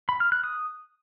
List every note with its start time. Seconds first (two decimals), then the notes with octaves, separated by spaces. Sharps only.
0.09 B5
0.20 F6
0.32 F#6
0.44 D#6